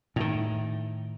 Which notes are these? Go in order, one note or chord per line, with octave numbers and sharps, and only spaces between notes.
A2 D#3